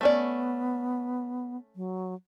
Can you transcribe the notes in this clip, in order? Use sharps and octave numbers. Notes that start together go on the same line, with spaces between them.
A3 B3 C#4 D5
F#3